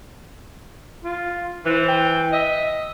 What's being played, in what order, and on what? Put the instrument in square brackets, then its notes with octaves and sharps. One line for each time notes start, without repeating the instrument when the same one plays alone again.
[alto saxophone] F4
[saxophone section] E3 [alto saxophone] C5
[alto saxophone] G5
[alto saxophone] D#5 [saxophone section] E5